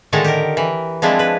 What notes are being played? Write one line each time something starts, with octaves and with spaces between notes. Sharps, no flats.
A2 D3 D#3 G#3 A5 A#5
G4 A#4
E3
F3 G#3 C4 D4 E4
B4